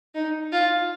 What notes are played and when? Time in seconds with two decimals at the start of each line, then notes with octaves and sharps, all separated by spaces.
0.15 D#4
0.52 F4